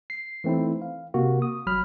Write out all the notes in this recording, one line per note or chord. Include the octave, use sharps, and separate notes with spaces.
C7
E3 A3 C4 D#4 E4
F5
C3 A#3 F#4
D#6
G#1 F#3 B5 F6